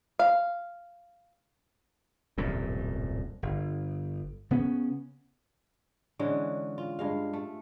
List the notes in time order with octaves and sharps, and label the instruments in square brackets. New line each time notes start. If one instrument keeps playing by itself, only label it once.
[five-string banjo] F5
[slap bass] D#1 C2 F#2 A2
G1
C#3 B3 C#4
[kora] D3 E3 G#3 C#4
F4
G2 G#3 F5
A3